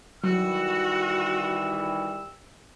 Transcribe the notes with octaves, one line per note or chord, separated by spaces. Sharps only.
D#3 E3 F#3 G3 F#4 E6